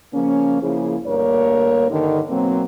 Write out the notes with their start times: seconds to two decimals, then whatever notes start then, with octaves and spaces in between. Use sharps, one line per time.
0.14 C#3 F3 A#3 C#4
0.61 C#3 F3 A#3 E4 G#4
1.06 D2 G2 A#3 A#4 C#5
1.90 G2 D3 D#3
2.30 B2 F#3 A#3 C4